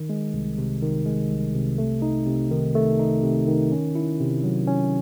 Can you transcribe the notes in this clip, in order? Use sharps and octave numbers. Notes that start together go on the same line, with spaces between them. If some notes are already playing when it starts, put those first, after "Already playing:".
Already playing: D#3
G#3
C2
C3
D#3
G#3
C2
C3
A3
D#4
C3
D#3
A3
D#4
C3
D#3
C#4
E4
C3
F#3
C#4